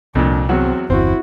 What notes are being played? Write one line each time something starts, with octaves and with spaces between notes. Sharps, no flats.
C2 F2 A#2 D4
E2 F#3 C4 F#4
G1 E2 C4 E4 F#4